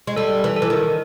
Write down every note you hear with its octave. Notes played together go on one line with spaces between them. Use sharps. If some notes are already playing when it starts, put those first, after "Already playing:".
G#3
G3 A4
E3
A4
E3
D#3